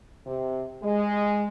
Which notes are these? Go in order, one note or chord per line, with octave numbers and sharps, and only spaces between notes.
C3
G#3